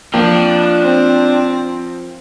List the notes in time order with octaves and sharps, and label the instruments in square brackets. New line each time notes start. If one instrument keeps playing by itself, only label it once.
[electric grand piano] F3 A#3 [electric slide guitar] D4 [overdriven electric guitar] F4 G5
[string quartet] C4